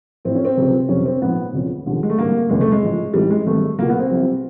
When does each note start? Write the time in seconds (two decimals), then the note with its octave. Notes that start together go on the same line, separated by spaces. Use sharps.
0.25 A1 A2 F3 C4
0.35 C#4
0.45 C4
0.57 C#2 C3 F3
0.89 G1 F2 C3 C#4
1.05 C4
1.21 A#1 G#2 F3 B3
1.53 E1 D2 C#3 F3
1.86 E1 D#2 D3 F3
2.03 G#3
2.10 A3
2.18 A1 G2 D3 A#3
2.49 F1 E2 C#3 G#3
2.61 A3
2.72 G#3
2.82 A1 G#2 F3
3.14 A1 G#2 E3 G3
3.30 G#3
3.47 G#1 G2 D#3 A3
3.79 C#2 A#3
3.82 B2
3.89 B3
3.99 C4
4.10 C2 C3 F3